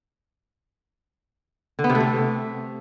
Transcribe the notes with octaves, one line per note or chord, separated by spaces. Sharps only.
D3
B3
C3
A3
C3